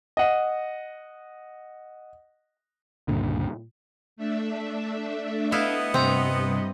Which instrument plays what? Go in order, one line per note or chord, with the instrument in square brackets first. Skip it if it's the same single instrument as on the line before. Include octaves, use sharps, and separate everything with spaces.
[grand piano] D#5 F#5
[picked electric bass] C#2 G2 A#2 D3
[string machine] A3 D4 E5
[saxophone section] B3 D#5 [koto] E4 F5
[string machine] G2 [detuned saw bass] C3 [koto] C4 A#5